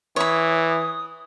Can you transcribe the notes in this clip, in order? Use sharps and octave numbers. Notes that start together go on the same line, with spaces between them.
E3 C#5 B5 D#6